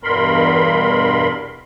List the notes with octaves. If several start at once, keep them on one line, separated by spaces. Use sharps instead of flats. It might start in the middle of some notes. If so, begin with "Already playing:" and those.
E2 G2 B2 A#4 B5 C6